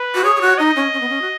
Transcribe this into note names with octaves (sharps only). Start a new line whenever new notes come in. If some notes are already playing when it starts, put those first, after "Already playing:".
Already playing: B4
F#4
G#4 C#5
G#4
F#4
D#4 D#5
C#4
C#4
B3
C#4
F#4